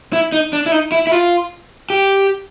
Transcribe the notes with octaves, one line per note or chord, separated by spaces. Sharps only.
E4
D#4
D4
E4
D#4
E4
E4
F4
G4